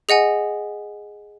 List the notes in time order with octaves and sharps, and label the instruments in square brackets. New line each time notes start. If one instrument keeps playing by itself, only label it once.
[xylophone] G#4 D#5 F#5 G#5